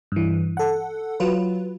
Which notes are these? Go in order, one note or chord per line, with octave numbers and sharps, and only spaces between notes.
G2 E3
A4 F#5
F#3 F4 B4